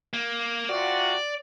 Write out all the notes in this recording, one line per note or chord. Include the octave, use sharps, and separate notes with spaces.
A#3
C3 F4 F#4 D5